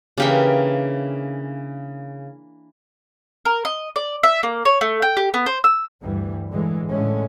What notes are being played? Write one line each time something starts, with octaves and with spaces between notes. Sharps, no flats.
C#3 E3 A#3 D4 G4 G5
A#4
D#5
D5
E5
A#3
C#5
A3
G5
G4
B3
C5
E6
D2 G2 E3 G3
A2 D3 E3 G#3
A2 D3 G#3 A3 C#4